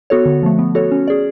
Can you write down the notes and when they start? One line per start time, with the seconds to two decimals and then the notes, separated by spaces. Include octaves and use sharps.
0.10 B3 F#4 A4 C#5
0.26 D3
0.43 F3 A3
0.59 B3
0.75 F#4 A4 C#5
0.91 C#4
1.08 G#4 D5